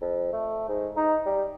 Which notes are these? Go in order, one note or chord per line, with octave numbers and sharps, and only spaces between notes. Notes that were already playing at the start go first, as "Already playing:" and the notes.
F2
A3
G#2
D#4
G3